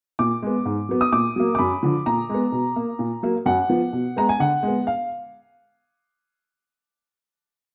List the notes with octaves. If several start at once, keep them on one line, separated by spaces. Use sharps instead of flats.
A#2 D6
G#3 B3
G#2
F#3 B3
D#6
A#2 D6
F#3 A#3
D6
F#2 B5
D3 F3
A#2 A#5
G#3 B3
B2
A#3
A#2
F#3 A#3
F#2 F#5
F3 B3
B2
G#3 B3 A#5
G#5
D3 F#5
G#3 B3
F5